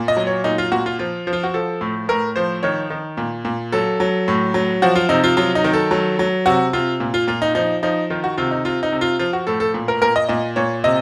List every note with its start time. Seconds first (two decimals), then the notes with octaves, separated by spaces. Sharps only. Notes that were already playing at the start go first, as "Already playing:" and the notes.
Already playing: A#2
0.08 D#5
0.17 F#3
0.27 C#5
0.44 A#2 D#4
0.58 F4
0.72 A#2 F#4
0.86 F4
0.99 F3 F4
1.27 F3
1.33 F4
1.43 F#4
1.54 F3 A4
1.81 A2
2.09 A2 A#4
2.36 F3 C5
2.63 D#3 C#5
2.90 D#3
3.17 A#2
3.45 A#2
3.72 F#3 A4
4.00 F#3
4.28 A2
4.54 F#3
4.82 F3 F#4
4.95 F4
5.09 C3 D#4
5.24 F4
5.37 F#3 F4
5.55 D#4
5.64 D#3
5.73 A4
5.91 F#3
6.19 F#3
6.46 C3 F#4
6.73 C3 F4
7.00 A#2
7.14 F4
7.28 A#2 F4
7.42 D#4
7.55 F3 D#4
7.83 F3 D#4
8.10 D#3 F4
8.24 F#4
8.38 C3 F4
8.51 D#4
8.65 C3 F4
8.83 D#4
8.92 C3
9.01 F4
9.19 F3 F4
9.33 F#4
9.47 A2 A4
9.60 A4
9.74 A#2
9.88 A#4
10.01 A#2 A#4
10.16 D#5
10.29 A#2 D#5
10.56 A#2 C#5
10.84 C3 D#5